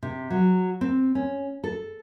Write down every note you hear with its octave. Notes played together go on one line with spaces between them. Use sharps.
C3
F#3
C4
C#4
A4